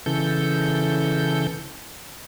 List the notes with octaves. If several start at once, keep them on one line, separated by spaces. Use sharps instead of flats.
C#3 E3 A4 G6